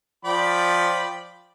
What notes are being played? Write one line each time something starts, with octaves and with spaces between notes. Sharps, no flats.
F3 D5 G5 B5